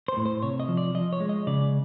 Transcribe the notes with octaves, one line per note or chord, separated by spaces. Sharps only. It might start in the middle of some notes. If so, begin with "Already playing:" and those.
C5
A2
C5
C3 C#5
D#5
F3
D5
F3 D#5
C#5
G#3
D#5
C#3 D5